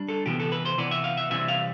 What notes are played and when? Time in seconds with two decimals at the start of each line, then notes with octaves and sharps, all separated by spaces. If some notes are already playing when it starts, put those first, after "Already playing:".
Already playing: G3 D4
0.09 A4
0.26 C3 E3 B3 G4
0.40 A4
0.52 B4
0.65 C5
0.78 C3 E3 B3 D5
0.91 E5
1.04 F5
1.17 E5
1.30 C3 E3 G3 C4 E5
1.48 F5